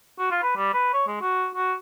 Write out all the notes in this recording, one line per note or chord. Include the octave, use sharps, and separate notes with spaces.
F#4
F4
B4
G3
B4
C#5
G#3
F#4
F#4